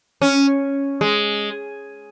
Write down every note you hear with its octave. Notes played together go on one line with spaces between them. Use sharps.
C#4
G#3